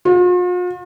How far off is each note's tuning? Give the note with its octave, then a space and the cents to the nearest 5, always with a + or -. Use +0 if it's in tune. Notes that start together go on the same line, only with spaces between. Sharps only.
F4 +45